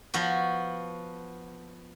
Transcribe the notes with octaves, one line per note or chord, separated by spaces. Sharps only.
F3 B3 F#4